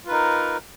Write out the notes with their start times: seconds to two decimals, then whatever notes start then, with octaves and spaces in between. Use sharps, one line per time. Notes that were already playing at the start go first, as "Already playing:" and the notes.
0.05 F4
0.08 B4
0.10 D#4
0.13 A#4